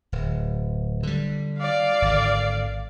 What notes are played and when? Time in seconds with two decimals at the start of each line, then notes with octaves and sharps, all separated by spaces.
0.12 D1
1.03 D3 G3
1.59 D5 F5
2.02 G#1 D3